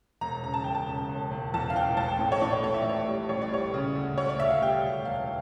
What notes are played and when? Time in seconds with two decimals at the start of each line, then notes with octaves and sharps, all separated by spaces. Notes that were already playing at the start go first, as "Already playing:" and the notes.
0.21 E1 A#5
0.43 C#3 A#5
0.54 A5
0.64 E1 G5
0.75 A5
0.88 C#3
1.09 E1
1.31 E1
1.54 E2 A5
1.70 F5
1.75 E1 G5
1.97 A1 A5
2.08 G5
2.19 A2 G5
2.32 C#5
2.41 A2 D5
2.53 C#5
2.63 A2 C#5
2.74 E5
2.82 D5
2.85 A1 C#5
2.96 D5
3.07 G3
3.29 A1 C#5
3.42 D5
3.51 G3 C#5
3.74 C#3
3.95 D2
4.17 D2 C#5
4.29 D5
4.40 D2 E5
4.50 F5
4.62 G3 G5
4.83 D2
5.05 E1 F5